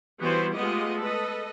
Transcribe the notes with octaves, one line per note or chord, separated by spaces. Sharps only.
E3 G3 B3 E4 F#4 C5
G#3 A3 B3 F4 G4 D#5
A4 B4 D#5